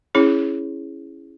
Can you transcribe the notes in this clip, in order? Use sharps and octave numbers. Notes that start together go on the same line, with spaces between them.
C#4 E4 G#4 C#5